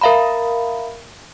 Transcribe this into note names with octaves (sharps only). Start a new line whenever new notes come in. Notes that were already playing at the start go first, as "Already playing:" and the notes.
A#4 E5 F5 A#5 B5